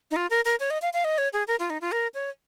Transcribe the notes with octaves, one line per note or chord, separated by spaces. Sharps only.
D#4
F4
A#4
A#4
C#5
D#5
F5
F5
D#5
C#5
G#4
A#4
F4
D#4
F4
A#4
C#5